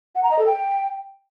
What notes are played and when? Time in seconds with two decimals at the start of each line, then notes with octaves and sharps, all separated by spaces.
0.15 F#5
0.23 A#5
0.31 D#5
0.39 A4
0.46 G5